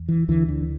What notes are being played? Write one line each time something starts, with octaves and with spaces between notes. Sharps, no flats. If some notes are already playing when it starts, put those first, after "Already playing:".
Already playing: E2
E3
D2 D3 E3
D3